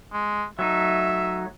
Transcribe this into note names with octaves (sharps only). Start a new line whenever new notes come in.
G#3
F#3 A3 D#4 E5